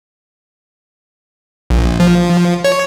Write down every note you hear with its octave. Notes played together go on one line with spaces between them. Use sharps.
A#1
F3
C#5